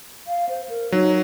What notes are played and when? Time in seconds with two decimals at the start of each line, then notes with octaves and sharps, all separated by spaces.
0.27 F5
0.49 C5
0.69 A#4
0.92 F#3 D#4